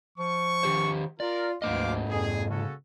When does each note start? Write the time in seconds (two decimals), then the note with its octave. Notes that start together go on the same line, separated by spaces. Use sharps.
0.18 F3 C#6
0.63 D#3 G4 C5
1.20 F4 A#4 D5
1.62 D2 G#2 A#3 C5 D#5 F5 D6
2.10 F2 G#4
2.50 C#3 C#4 F#4 A4